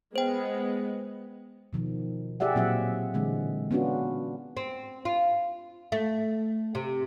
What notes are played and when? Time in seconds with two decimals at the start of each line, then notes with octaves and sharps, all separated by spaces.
0.16 G#3 B3 C5 G5
1.73 B2 D#3 F3
2.40 G4 G#4 D5 E5 F#5
2.55 A#2 F#3 C4 F4 E5 F#5
3.14 D3 E3 G#3 C4
3.71 B3 C#4 D4 F4 F#4
4.57 C4
5.05 F4
5.92 A3
6.75 C3